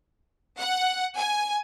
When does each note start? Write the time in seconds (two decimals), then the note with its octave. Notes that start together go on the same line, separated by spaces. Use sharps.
0.59 F#5
1.16 G#5